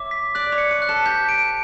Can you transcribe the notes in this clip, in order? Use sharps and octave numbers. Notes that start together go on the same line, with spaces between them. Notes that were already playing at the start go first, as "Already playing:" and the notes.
Already playing: C#5 E5 D6
B6
D5 F#6
C#5
C#7
B4
F#6
A4
G4 G6
D7